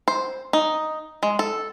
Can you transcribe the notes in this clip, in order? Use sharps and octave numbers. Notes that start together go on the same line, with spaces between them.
C5
D#4
G#3
A4